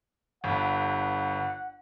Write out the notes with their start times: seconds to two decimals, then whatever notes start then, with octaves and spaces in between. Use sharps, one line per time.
0.44 G1 G2 F#5